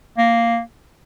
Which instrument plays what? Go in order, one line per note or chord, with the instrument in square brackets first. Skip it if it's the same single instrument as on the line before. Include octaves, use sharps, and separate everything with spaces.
[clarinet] A#3